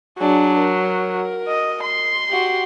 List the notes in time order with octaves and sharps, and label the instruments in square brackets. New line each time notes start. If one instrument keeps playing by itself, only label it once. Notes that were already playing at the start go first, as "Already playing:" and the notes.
[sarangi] F#3 [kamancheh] D4 G#4
[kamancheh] A#4
[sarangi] D#5
C6
[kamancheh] F#4 G4